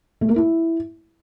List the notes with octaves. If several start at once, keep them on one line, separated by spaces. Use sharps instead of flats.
A3
A#3
E4